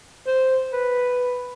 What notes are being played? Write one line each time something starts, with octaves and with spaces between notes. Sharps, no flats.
C5
B4